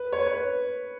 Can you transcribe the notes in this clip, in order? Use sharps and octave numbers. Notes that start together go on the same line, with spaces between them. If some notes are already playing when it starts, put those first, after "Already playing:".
Already playing: B4
C#5
C#5
B4